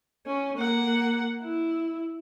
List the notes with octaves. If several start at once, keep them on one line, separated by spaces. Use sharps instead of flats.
C#4
A#3 F#5
E4